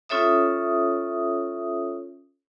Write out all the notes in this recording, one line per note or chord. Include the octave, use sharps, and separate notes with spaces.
C#4 F4 A4 C#5 E5 D#6